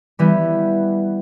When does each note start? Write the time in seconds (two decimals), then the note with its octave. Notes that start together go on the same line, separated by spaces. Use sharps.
0.19 E3 G3 B3